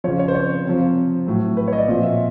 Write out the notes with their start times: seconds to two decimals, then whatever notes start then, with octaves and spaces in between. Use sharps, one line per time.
0.04 C#3 F3 C#5
0.19 C#5
0.28 C5
0.35 C#5
0.65 C3 F3
1.27 A2 F#3
1.57 B4
1.68 C#5
1.73 D#5
1.78 D5
1.88 A#2 F3 D#5
2.03 E5